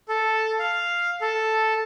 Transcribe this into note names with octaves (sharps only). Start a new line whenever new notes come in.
A4
F5
A4